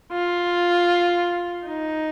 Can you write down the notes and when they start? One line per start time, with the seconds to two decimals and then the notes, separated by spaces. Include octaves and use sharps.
0.12 F4
1.67 D#4